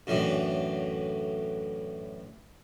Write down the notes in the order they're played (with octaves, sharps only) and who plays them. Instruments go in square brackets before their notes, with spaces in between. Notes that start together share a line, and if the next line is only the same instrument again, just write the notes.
[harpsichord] F#2 A2 D3 E3